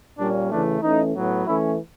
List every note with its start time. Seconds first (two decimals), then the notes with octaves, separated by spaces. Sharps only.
0.18 A#2 G3 A#3 C#4 D4
0.51 C#3 E3 A3 D4
0.82 E3 A3 C#4 D#4
1.14 A2 F#3 B3
1.46 E3 A3 C#4 E4